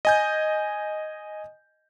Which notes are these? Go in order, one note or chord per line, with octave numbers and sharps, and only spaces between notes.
D#5 G#5 G6